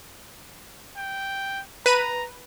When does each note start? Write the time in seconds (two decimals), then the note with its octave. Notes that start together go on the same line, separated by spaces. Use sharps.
0.97 G5
1.86 B4 A#5 D#7